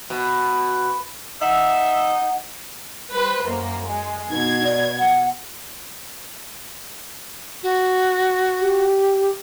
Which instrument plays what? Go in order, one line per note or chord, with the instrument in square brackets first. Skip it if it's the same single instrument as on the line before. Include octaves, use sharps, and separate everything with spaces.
[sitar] B2
[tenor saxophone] D#4 [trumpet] E5 [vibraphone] F#5
[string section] G3 B4 C5
F#2 A#3
G#3
[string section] B2 G#6 [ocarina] D#4
[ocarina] D5
F#5
[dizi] F#4
[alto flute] G4